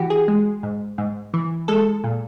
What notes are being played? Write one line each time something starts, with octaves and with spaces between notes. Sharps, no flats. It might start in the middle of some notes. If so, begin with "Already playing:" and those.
Already playing: E3 F#4 G4
G#4
G#3
G#2
G#2
E3
G#3 A4
A#2